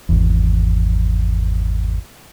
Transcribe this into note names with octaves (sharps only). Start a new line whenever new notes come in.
G#1 E2